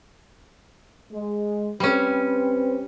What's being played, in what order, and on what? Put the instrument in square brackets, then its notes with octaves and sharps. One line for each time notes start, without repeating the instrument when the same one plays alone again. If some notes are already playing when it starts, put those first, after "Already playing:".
[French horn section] G#3
[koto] G3 C#4 [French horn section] C4 B4